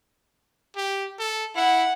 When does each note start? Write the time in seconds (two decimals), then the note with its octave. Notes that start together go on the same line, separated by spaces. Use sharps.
0.76 G4
1.19 A4
1.55 E4 F#5